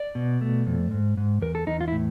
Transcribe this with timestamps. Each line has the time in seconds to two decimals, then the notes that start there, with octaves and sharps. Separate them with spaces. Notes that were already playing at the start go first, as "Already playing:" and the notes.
Already playing: D5
0.15 B2
0.41 A3
0.67 F2
0.91 G#2
1.17 G#2
1.42 E2 A#4
1.55 A4
1.67 E2 D#4
1.81 F4
1.88 E4
1.92 A2